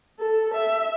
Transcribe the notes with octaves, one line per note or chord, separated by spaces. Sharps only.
A4
E5